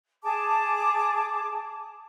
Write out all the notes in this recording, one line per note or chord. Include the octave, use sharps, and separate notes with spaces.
G#4 A5 D6